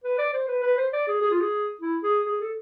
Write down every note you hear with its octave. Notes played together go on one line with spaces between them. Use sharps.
B4
D5
C5
B4
B4
C5
D5
G#4
G#4
F4
G#4
E4
G#4
G#4
A4